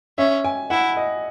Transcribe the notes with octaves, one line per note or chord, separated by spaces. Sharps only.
C#4 E5
G#5
E4 F#5
D#5